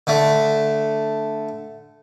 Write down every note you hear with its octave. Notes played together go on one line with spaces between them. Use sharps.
D3 A3